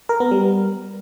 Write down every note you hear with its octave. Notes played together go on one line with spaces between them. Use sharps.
A#4
B3
G3